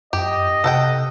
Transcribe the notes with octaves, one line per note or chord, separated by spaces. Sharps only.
F#2 G4 D#5
C3 A4 F#5 G5